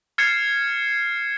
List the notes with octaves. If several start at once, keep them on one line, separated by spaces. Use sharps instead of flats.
F6 G#6 A6 C7 C#7 E7